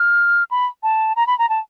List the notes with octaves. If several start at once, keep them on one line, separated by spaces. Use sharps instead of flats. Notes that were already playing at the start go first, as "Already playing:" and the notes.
Already playing: F6
B5
A5
A#5
B5
A#5
A5